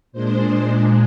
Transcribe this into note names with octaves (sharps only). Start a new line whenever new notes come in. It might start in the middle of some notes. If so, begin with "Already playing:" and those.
A#2 G#3 D4 C5